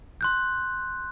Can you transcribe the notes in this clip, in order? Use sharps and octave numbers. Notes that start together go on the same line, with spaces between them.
C6 F#6 G6